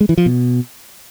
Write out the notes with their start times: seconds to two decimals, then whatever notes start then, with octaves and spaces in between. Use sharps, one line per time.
0.01 G#3
0.09 E3
0.18 F3
0.26 B2